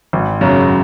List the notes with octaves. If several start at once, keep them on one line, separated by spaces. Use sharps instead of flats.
G#1
F#2 C#3 F#3